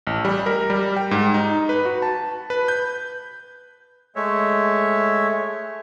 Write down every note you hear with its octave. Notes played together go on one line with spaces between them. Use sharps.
A1
G3
A#4
G3
G5
G#2
D#4
B4
F#4
A5
B4
G6
G#3 A3 C#5 E5